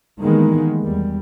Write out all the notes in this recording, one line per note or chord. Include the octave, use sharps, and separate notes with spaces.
D#3 E3 G3 G#3 A#3 B3
E2 G3